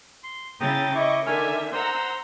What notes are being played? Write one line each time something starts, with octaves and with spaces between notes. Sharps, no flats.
C6
C#3 E4 G5 A#5 D#6 A6
E4 D#5 C#6 D6
D3 D#3 E5 G#5 F6
C5 F#5 A#5 C6 E6